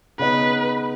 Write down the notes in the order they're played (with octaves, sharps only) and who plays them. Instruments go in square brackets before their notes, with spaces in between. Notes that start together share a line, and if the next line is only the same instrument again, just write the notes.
[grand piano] C#3 B3 D#4 [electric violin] B4